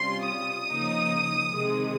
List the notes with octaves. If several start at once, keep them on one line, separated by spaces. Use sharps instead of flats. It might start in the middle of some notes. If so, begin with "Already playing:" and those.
Already playing: C3 G3 C#4 F4 C6
D#6
C#3 F3 A#3 D#4
C3 D#3 G#3